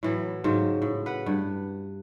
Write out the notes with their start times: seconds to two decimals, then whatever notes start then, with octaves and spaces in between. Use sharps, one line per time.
0.03 A2 E3 F#3
0.44 G#2 C#3 F#3 G4
0.82 A2
1.06 B4 F#5
1.26 G2